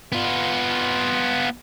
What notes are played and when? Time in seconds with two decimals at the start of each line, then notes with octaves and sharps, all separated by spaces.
0.12 B3 F4